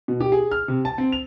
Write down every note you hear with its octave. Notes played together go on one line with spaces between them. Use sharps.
B2
G4
G#4
F6
C3
A5
C4
F7